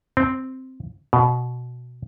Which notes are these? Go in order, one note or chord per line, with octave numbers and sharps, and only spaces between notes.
C4
B2